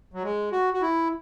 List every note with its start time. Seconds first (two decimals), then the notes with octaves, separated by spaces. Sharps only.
0.14 F#3
0.23 G#3
0.52 F#4
0.74 F#4
0.82 E4